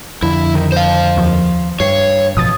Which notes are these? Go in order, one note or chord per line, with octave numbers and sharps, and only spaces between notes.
F2 D3 E4
D#3
C5 F5
D#2 F3
G2 C#5 C7
A1 B2 F3 D#6 A6